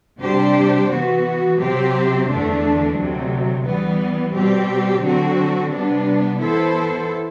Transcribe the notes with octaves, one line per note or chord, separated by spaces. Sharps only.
C3 G3 D4 G4 C5
E3 B3 F#4
C3 F#3 C4 G4 C5
E2 D3 A3 D4
D2 C3 F#3
E3 G3 B3
B2 G3 C4 G4
D3 F#3 C4 F#4
C3 G3 B3 D4
E3 B3 E4 A4 C5